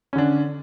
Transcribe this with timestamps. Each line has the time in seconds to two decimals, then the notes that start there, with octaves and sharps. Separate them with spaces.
0.13 C#4
0.16 D3
0.18 D4